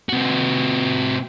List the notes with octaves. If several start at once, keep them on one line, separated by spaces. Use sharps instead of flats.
C3 F#4